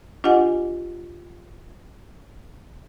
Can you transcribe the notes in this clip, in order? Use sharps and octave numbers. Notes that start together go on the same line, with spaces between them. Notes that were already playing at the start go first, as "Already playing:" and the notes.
D4 F4 G4 D#5 F#5 G#5